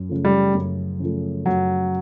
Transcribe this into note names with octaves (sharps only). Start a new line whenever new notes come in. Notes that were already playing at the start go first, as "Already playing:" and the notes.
Already playing: F#2
C#3 F3 A3
G3
F#2
C#3 F3 A3
F#2 F#3